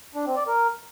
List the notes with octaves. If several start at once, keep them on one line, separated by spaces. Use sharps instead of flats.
D4
C4
D5
A#4